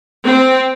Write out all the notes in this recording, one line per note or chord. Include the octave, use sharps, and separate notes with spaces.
C4